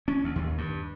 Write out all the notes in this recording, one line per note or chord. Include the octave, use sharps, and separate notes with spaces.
C#4
D2
D#2
G2